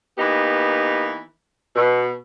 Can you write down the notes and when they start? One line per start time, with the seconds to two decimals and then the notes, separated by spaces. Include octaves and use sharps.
0.18 E3 A#3 B3 D#4 G4
1.76 B2